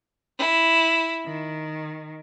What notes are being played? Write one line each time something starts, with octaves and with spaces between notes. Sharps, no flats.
E4
D#3